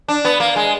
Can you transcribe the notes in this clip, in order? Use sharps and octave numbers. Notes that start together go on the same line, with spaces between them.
D4
B3
A#3
G#3